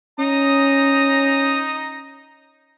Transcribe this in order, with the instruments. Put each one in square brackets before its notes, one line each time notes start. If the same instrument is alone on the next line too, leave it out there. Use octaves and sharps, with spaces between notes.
[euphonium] C#4 [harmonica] D#4 A#5 D#6